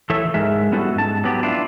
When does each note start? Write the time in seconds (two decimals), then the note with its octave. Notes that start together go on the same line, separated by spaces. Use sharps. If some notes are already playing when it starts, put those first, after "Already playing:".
0.10 E3 A3 A4 C#5 E5
0.34 G#2 G#3 A#4 E5
0.72 G3 B3 C#4 E4 F#4 A4
0.96 G#2 A5
1.24 F#3 B3 G4
1.43 D4 E4 F4